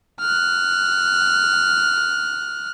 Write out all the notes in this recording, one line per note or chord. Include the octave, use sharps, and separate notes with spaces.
F6 F#6